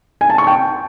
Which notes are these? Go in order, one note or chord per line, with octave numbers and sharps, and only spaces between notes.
G#5
A5
C#6
G5